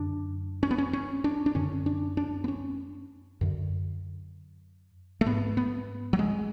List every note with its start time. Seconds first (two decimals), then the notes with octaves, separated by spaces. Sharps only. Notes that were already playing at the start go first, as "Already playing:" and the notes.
Already playing: F#2 D3 D4
0.63 C#4
0.71 B3
0.78 C#4
0.93 C#4
1.24 D4
1.46 D4
1.55 F#2 D3 C#4
1.86 D4
2.17 D4
2.44 B3
2.48 C#4
3.41 F#2 D3
5.21 A3
5.26 G#2 B3
5.57 B3
6.13 F#3
6.19 G#3